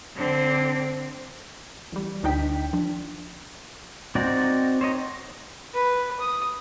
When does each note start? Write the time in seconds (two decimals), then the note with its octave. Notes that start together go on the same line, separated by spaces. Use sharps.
0.16 D3 C4
1.92 A1 G3
2.23 D2 D4 D#4 G5 B6
2.73 F3 D4
4.15 C4 D#4 F#4 C5 D5
4.81 C5 C#5 D#5 A#5
5.74 B4
6.20 D#6